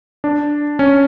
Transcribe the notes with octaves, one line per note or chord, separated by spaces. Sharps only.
D4
C#4